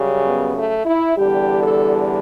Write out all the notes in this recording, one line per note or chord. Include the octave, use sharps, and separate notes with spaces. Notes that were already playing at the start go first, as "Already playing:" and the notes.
Already playing: F#2 C#3 G3
B3
A3
E4
E2 D3 G3 G4
A4